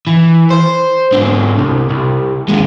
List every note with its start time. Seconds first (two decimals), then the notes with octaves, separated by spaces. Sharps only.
0.07 E3
0.50 C5
1.13 G#2 D3
1.58 C2
1.90 C2
2.48 D#2 G#3